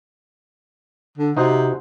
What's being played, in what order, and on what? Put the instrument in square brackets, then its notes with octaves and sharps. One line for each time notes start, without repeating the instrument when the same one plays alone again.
[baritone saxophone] D3
[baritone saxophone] C3 [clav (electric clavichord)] D#4 F#4 C5